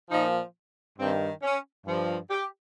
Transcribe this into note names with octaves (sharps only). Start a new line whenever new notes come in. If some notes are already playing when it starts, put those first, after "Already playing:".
A#2 F3 D#4
G2 D#3 C4
C#4
G2 F3
G4